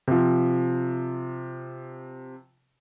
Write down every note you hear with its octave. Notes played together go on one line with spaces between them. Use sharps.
C3 F3